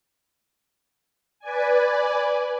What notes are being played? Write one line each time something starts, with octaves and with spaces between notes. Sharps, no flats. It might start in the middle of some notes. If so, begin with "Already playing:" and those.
B4 D5 G#5